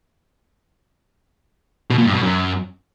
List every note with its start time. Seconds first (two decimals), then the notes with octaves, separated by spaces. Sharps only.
1.90 B2
1.98 A#2
2.06 G2
2.14 B2
2.22 F#2